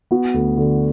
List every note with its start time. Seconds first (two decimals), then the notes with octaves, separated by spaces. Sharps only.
0.11 B3 F#4
0.34 D2
0.57 D3